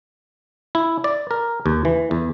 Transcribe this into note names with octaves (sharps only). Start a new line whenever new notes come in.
E4
D5
A#4
D#2
E3
E2